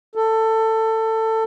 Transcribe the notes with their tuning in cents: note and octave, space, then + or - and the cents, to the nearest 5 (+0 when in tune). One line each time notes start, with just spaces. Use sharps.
A4 +20